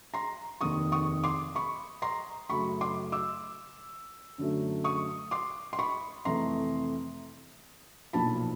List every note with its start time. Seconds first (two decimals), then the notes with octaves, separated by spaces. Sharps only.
0.14 A#5 C6
0.61 F1 D#2 D#3 C#6 D#6
0.92 C#6 D#6
1.24 C6 D6
1.55 B5 C#6
2.02 A#5 C6
2.50 F#2 C#3 F#3 A3 B5 C#6
2.81 C6 D6
3.12 D6 E6
4.38 F#2 D3 F#3 A3
4.84 C#6 D#6
5.31 C6 D6
5.73 C6
5.79 B5 C#6
6.25 F2 C3 E3 A3 A#5 C6
8.13 B1 A#2 F3 A5 B5